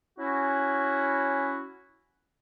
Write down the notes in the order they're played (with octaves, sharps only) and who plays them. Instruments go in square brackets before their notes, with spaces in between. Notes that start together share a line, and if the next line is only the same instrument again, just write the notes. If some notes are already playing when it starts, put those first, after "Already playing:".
[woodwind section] C#4 E4 F#4